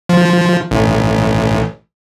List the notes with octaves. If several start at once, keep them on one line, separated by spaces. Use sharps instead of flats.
F3
A1